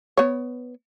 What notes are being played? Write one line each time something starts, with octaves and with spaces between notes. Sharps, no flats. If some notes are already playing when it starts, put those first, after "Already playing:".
B3 C#5